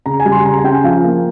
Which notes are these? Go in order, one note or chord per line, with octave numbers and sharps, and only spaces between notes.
C#3 A#5
G#5
G3
C6
C#3 A#5
G#5
C#4 G5
F3 F5
A#3